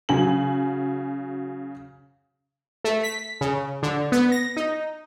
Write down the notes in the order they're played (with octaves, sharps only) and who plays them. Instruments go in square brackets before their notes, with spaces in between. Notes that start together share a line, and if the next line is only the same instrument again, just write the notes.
[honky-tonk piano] C#3 F#3 G#5 F#7
[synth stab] A3
B6
C#3
D3
B3
A#6
D#4